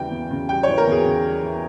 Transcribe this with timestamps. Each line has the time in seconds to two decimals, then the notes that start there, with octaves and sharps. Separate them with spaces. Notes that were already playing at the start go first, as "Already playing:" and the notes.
Already playing: E2 C#3 E3 G3 G5
0.11 E2
0.31 C#3
0.49 G3 G5
0.63 C#5
0.68 E3
0.78 A#4
0.87 E2 G#4
1.06 C#3
1.25 G3
1.43 E3